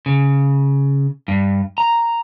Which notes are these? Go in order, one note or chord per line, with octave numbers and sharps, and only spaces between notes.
C#3
G2
A#5